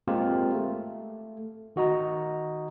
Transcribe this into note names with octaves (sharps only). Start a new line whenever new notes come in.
G#3 A#3 C4 F4 G4 A#4
A3
D#3 F#4 D#5 A#5